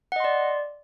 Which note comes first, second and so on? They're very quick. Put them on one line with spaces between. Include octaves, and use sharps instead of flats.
F#5 D#5 C6 D5